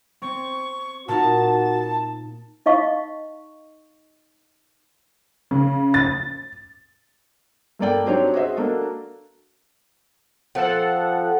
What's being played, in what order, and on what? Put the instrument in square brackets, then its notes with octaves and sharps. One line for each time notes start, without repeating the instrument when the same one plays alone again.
[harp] C4 [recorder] C#6
[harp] A#2 D#4 [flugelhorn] F#4 [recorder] A5
[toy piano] D#4 D#5 F5 C#6
[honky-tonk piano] C#3
A6
[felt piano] G2 A#3 A4 D5 G5
F#3 C4 D4 D#4 G4 C#5
F#4 G#4 C5 D#5 E5
A#3 D4 F#4 A4
[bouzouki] F3 C4 [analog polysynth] A4 F#5